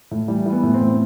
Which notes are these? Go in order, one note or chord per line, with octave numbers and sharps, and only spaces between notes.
A2
E3 G3
E3
B3
A2
C4
A2